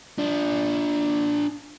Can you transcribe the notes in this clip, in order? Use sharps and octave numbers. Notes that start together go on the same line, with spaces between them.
D4 F4